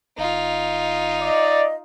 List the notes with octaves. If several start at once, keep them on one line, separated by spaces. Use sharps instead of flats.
G1 D#4 F4
D5 D#5